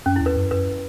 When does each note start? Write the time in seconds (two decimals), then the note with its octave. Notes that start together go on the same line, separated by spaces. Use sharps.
0.06 F#2 C#4
0.16 E4
0.21 E2 B4
0.36 F#2
0.51 F#2 B4